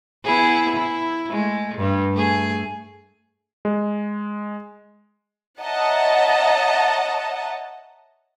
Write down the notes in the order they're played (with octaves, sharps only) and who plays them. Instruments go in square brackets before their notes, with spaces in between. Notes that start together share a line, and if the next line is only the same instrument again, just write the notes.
[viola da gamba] B3 E4 G#4
E4
G#3 A3
G2
A3 G#4
[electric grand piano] G#3
[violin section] C#5 D#5 E5 F#5 A5 A#5